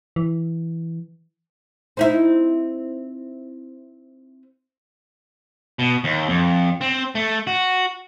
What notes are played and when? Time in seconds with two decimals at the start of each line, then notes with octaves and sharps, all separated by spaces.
0.16 E3
1.97 C4 D#4 E4
5.79 B2
6.04 D#2
6.29 F2
6.81 C4
7.15 A3
7.47 F#4